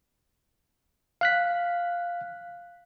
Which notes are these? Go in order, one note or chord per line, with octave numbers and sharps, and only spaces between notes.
F5 F#6 B6